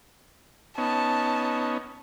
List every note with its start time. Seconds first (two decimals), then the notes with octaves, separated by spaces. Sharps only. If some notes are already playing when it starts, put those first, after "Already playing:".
0.78 B3 C#4 D#4 A5